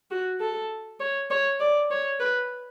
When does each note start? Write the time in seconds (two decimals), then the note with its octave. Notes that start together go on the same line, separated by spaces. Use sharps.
0.11 F#4
0.40 A4
1.00 C#5
1.31 C#5
1.60 D5
1.91 C#5
2.20 B4